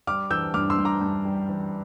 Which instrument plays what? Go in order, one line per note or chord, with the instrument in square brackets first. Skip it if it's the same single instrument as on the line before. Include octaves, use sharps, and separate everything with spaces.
[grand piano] G3 D6 F6
E3 E6 G6
G2 D6 F6
C6 E6
G2
A#5 D6
G2
G3
E3